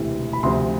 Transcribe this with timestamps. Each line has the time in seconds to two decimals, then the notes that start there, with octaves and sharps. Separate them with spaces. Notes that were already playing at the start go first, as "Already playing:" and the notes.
Already playing: E1 D2 C3 E3
0.33 B5
0.43 D2 C3 F3 C6